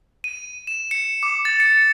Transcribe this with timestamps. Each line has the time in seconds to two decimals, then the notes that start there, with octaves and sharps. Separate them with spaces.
0.24 D#7
0.67 E7
0.91 C#7
1.23 D6
1.45 A6
1.60 C#7